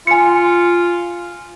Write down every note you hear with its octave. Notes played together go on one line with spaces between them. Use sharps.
F4 G#5 C#7